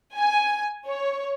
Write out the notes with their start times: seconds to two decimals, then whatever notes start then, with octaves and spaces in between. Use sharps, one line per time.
0.17 G#5
0.89 C#5